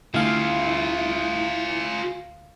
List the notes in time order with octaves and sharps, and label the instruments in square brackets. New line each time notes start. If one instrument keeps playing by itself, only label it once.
[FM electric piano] D2 F5 [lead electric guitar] E4 [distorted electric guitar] F4 G#4